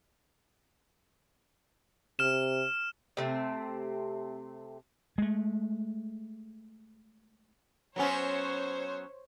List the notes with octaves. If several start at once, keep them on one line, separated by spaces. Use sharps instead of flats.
C3 F6 E7
C3 A3 C4
G#3 A3
F#3 B3 C#4 C5 C#5